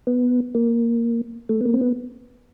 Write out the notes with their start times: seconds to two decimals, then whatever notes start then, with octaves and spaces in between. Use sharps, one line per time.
0.07 B3
0.55 A#3
1.49 A3
1.61 B3
1.65 A#3
1.74 C4
1.81 B3